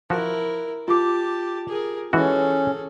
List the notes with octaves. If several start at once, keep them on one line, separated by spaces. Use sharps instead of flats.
F3 E4 F#4 A#4
F4 G4 A5 D6
G#4 A#4
E3 G#3 C#4 F#4 G#4 A4